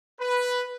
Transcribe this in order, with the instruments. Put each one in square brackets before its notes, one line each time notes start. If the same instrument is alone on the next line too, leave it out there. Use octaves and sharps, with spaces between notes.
[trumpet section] B4